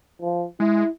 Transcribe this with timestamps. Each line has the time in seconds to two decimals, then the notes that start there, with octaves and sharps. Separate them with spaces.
0.21 F3
0.60 G#3 E4